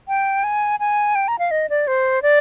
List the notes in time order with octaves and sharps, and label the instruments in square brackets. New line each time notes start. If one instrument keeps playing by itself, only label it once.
[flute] G5
G#5
G#5
G5
A#5
F5
D#5
D5
C5
D5